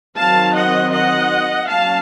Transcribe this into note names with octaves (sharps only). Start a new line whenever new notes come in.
D#3 F#3 C4 F5 A5
D#5 F#5
D#5 F#5
F#3 A#3 C#4 F5 A5